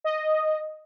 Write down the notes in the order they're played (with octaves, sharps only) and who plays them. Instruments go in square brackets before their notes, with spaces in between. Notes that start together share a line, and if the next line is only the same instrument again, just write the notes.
[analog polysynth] D#5